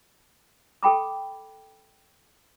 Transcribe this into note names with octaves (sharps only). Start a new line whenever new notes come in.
A4 G5 B5 D6